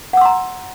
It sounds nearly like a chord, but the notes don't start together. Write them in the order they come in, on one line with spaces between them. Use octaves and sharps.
F#5 E6 C6 A#5